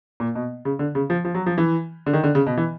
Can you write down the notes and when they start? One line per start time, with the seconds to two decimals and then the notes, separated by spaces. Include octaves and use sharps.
0.20 A#2
0.35 B2
0.65 C#3
0.79 D3
0.95 C#3
1.10 F3
1.25 F3
1.35 F#3
1.46 F3
1.58 E3
2.06 D3
2.13 D#3
2.24 D3
2.35 C#3
2.46 B2
2.57 E3